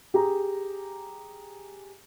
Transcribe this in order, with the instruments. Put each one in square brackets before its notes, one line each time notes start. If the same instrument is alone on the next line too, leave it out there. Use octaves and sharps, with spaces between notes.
[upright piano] G4 G#4 A#5